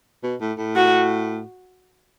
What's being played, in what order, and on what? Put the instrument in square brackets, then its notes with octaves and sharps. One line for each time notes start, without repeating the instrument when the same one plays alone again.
[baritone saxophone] B2
A2
A2
[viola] F#4